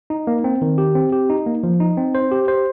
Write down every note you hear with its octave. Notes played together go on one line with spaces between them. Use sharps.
D#4
A#3
C4
D#3
G4
C4
G4
D#4
A#3
F3
D#4
C4
C5
G4
C5